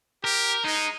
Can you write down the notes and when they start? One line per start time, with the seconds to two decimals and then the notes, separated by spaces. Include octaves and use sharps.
0.24 G4 A#4
0.64 G#3 D#4